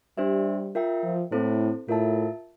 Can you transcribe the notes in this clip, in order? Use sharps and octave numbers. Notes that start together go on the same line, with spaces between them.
G3 D4 G4 C5 E5
F4 A#4 E5 G5
F3
A2 C4 E4 A4 C5
A2 F4 A#4 E5 A5